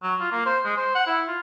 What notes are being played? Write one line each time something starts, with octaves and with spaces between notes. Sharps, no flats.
F#3
F4
A#3
C5
G#3
C5
F#5
E4
F4